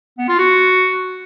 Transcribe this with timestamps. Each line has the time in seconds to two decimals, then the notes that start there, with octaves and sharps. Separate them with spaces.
0.18 B3
0.28 F4
0.38 F#4